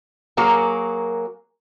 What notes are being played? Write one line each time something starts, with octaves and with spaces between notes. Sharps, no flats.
F#3 A#3 F#4 G#4 A#4